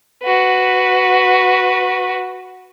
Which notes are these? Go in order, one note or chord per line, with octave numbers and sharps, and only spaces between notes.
F#4 B4